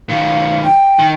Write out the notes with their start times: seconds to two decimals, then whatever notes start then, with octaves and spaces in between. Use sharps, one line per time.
0.10 D#3 F#3 F5
0.63 G5
0.99 D#3